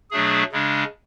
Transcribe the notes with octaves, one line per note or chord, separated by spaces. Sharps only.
B2 F#3 A3 D4 G#4
C#3 G#3 D4